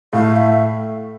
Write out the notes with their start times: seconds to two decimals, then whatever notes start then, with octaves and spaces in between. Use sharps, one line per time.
0.13 A2 A3 F5
0.36 E5